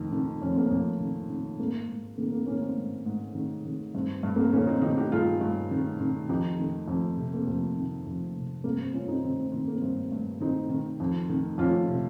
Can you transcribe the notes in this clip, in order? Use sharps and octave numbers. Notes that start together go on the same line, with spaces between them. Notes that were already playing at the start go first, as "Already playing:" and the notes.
Already playing: F2 D#3
D#3
F2 C#4
C4
A#3 C#4
F2
D#3
D#3
G#2 A#3
G#2
D#3 A#3
A#3
D#3 A#3 C#4
C4
G#2
G#2
D#3
D#3
G2 C4
G2
A#3
C4
D#3 A#3 C#4
C4 D#4
D#3 D#4 G4
D#4 G4
G2 F4 G#4
G2
D#3
D#3
F2 D#4 G4
D#3
F2
C3
A#3
F2 C4
D#3
F2
C3
G2 A#3
C4
G2 C#4 F4
C4 D#4
D#3 C4
C4
D#3 C4
A#3
G2 C4
G2
D#3 C4 D#4
D#3
F2
D#3
F2 C#4 F4
C3